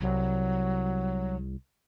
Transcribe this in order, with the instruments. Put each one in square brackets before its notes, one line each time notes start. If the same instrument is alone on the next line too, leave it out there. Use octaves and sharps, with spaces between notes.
[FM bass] C2 [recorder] F#3